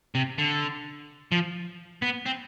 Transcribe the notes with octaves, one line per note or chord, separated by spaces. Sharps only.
C3
D3
F3
B3
C4